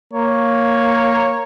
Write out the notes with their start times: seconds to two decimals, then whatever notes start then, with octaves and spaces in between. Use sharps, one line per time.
0.13 A#3 C#5